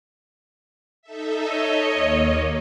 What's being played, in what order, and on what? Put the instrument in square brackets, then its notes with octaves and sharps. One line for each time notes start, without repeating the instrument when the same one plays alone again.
[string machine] D#4 A4 E5
[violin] C#5 D#5
[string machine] D#2 A#3